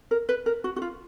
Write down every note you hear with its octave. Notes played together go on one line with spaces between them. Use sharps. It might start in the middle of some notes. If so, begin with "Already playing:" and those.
A#4
B4
A#4
F#4
F#4
F4